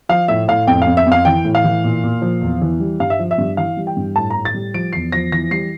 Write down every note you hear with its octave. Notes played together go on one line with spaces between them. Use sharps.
F3 F5
A2 E5
A2 F5
F2 G5
F5
F2
E5
F2
F5
E3 G5
A2
F5
E3
A#2
A#2
F3
E2
E3
G3
G2 F5
E5
F3
E5
G2
E3 F5
G3
G5
G2
A2 A5
A2 A#5
A6
G3
F3 D7
E2 C7
F3 A#6
E3 A#6
G3 C7